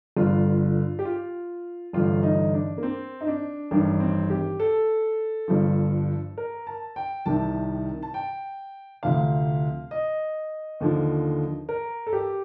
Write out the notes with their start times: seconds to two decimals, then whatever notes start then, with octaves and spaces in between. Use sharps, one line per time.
0.17 G1 G2 D3 F4
0.99 G4
1.05 F4
1.93 A1 G2 D3 F4
2.23 D#4
2.54 D4
2.78 A#3
2.83 C4
3.21 D#4
3.27 D4
3.71 A1 G2 D#3 D4
4.00 C4
4.30 G4
4.60 A4
5.48 G1 G2 F3
6.38 A#4
6.67 A5
6.96 G5
7.26 C2 C3 D#3 A5
8.03 A5
8.14 G5
9.03 D2 C3 F3 F5
9.91 D#5
10.80 D#2 D3 F3
11.69 A#4
12.07 A4
12.13 G4